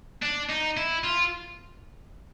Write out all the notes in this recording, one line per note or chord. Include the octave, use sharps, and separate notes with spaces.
D4
D#4
E4
F4